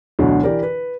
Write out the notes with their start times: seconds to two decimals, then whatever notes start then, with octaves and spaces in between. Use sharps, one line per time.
0.19 A1 D2 B2 D3 E3 F#3
0.43 E3 G4 A#4 D5
0.63 B4